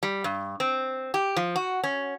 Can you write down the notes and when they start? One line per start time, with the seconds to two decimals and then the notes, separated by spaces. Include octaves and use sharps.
0.03 G3
0.24 G2
0.60 C4
1.14 G4
1.37 F3
1.56 F#4
1.84 C#4